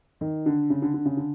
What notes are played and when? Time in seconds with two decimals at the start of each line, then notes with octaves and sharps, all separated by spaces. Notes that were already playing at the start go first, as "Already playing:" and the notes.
0.21 D#3
0.46 D3
0.70 C#3
0.82 D3
0.94 D3
1.05 C#3
1.17 D3